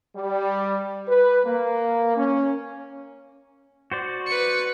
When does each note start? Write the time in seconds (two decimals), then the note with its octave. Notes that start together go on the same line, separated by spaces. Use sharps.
0.16 G3
1.08 B4
1.46 A#3
2.17 C#4
3.92 F#4 C5 D5
4.27 B4 C#7